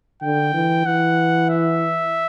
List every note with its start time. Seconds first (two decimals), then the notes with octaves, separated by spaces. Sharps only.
0.22 D3 G5
0.54 E3
0.86 E3 F#5
1.50 E5